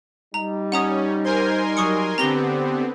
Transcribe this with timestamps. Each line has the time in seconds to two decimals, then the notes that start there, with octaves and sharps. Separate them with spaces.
0.34 G3 D#4 A#5
0.72 C#4 F#5 A#5 D#6
1.25 A#4 C5 G#5 C6
1.77 F#3 C#6 D#6 C#7
2.18 D3 B3 C4 G4 A#5 A#6 G7